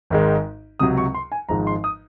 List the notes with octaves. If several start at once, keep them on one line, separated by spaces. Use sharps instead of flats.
G#1 G#2 D#3 G#3
C#2 C3 F#3 D#6
C#6
C6
G#5
G#1 G#2 F3 G#3 A#5
C6
D#6